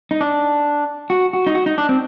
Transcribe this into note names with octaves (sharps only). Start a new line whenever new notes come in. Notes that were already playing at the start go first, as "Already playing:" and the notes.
D#4
D4
F#4
F#4
D#4
F#4
D#4
D4
C4